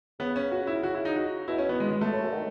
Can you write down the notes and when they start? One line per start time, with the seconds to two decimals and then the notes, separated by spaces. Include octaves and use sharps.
0.19 C#3 B3
0.36 C#4
0.52 F#4
0.67 E4
0.83 F#4
0.94 E4
1.05 D#4
1.16 F#4
1.48 B2 E4
1.58 C#4
1.69 B3
1.80 G#3
1.91 G#3
2.01 A3
2.12 A2
2.23 F#2
2.33 D#3